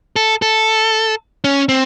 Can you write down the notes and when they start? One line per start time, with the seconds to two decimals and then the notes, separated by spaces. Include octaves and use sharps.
0.16 A4
0.42 A4
1.44 C#4
1.69 C4